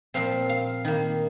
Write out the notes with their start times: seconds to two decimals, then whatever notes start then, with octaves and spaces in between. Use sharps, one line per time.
0.14 A#2 F3 C4 F5
0.49 F5
0.85 D#3 A#3